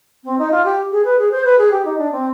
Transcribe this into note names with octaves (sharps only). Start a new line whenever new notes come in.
C4
D#4
F4
G4
G#4
B4
G#4
C5
B4
G#4
G4
D#4
D4
C4